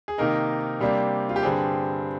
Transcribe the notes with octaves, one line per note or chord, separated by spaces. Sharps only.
G#4
C3 D#3 A#3 D#4 A#4
C3 G3 A#3 D4
F4
G4
G2 D3 G3 C4 G#4